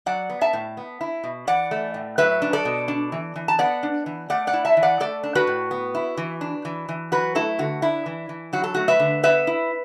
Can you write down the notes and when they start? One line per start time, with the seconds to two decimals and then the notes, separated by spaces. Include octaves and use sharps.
0.06 F#3 D5 F#5
0.29 B3
0.41 E5 A5
0.53 A2
0.77 B3
1.01 E4
1.24 B2
1.47 E3 D5 F#5
1.71 A3
1.94 A2
2.18 F#3 B4 E5
2.42 D4
2.53 A4 D5
2.65 B2
2.88 D4
3.12 E3
3.36 E3
3.48 A5
3.59 B3 D5 F#5
3.83 D4
4.06 E3
4.30 A3 D5 F#5
4.47 D5 F#5
4.53 E4
4.65 E5 A5
4.77 E3
4.83 D5 F#5
5.00 A3 A4 D5
5.23 D4
5.35 F#4 B4
5.47 A2
5.71 B3
5.95 E4
6.18 E3
6.41 D4
6.65 E3
6.89 E3
7.12 F#3 F#4 B4
7.35 A3 E4 A4
7.59 D3 F#4
7.82 D4 E4
8.06 E3
8.29 E3
8.53 F#3 F#4
8.64 A4
8.75 A3 F#4
8.88 B4 E5
9.00 D3
9.23 B3 B4 E5
9.47 E4